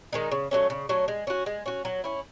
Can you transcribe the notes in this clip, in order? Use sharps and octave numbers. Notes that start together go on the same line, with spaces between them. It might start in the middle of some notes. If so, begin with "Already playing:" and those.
D#3 G#3 D#4
C#3
F#3 A3 C#4
C#3
F#3 A3 C#4
G#3
C#4 F#4
G#3
C#4 F#4
F#3
C#4 E4